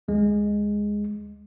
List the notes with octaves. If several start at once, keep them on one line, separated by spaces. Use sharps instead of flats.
D2 G#3